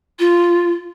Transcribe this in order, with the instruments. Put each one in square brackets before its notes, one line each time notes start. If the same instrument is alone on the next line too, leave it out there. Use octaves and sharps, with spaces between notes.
[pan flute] F4